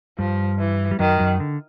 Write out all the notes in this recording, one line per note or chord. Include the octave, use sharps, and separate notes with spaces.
G2 F3 G3
E3
G3
F#2 D#3 F#3
F#2 F#3
D3